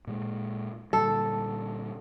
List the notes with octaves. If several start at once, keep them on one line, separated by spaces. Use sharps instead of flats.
A#2 G#3
A#2 D3 G3 A4